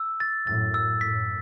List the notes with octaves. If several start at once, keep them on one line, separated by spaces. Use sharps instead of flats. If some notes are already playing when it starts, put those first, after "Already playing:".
Already playing: E6
A6
F#2 A2 A6
E6
F#2 A2 B6